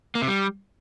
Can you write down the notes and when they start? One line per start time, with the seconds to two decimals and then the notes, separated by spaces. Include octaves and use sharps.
0.15 A#3
0.22 C3
0.28 G3